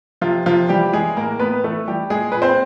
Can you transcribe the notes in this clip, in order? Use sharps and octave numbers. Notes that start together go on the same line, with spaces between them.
C3 F3 F4
C3 F3 F4
E3 G3 G4
E3 G#3 G#4
A2 A#3 A#4
A2 B3 B4
E3 A3 A4
E3 G3 G4
A#2 G#3 G#4
A#2 B4
C4 C5